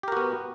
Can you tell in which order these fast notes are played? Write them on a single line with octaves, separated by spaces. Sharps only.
G4 A#4 F#4 B3